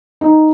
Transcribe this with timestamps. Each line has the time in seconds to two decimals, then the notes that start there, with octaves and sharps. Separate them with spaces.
0.21 D#4